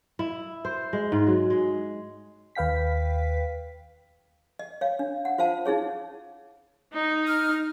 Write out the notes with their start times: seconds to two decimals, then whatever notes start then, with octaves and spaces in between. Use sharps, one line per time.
0.19 E4
0.65 C5
0.93 G#3
1.12 G#2
1.27 F#3
1.50 G#3
2.55 D#2 B4 F5 G5 B6
4.59 D#5
4.81 C#5 F5
4.99 D4
5.25 F#5
5.38 F4 C5 F5 A5
5.66 D#4 E4 G#4 C#5
6.93 D#4
7.28 F6